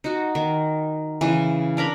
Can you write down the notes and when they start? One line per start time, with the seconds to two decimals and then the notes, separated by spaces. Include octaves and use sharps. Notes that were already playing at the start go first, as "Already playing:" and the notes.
0.04 D#4 F#4
0.35 D#3
1.21 C#3 E3
1.77 D4 A#4 A#5 B5